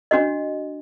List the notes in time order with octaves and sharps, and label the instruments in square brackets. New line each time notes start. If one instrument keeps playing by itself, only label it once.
[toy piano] D4 F#4 D#5